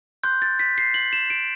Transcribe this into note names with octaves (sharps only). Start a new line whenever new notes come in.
C6 F#6 G6
A6
B6
C7
F#7
E7
D7